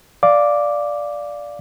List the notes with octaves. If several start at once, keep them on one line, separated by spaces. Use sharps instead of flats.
D5 F5 D6